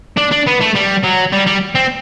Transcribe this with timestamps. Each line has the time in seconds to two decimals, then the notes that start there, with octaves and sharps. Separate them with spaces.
0.17 D4
0.31 D4
0.47 B3
0.61 A3
0.75 G3
1.03 F#3
1.32 G3
1.46 G3
1.75 C4